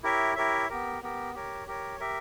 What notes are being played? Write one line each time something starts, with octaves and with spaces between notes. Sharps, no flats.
E4 G4 A#4 C#5 E5
E4 G4 A#4 C#5 E5
B3 G4 A#4
B3 G4 A#4
G4 A#4 C#5
G4 A#4 C#5
G4 A#4 E5